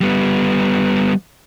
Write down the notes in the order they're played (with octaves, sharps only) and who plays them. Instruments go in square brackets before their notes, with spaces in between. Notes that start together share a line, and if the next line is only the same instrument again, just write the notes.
[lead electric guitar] G3 B3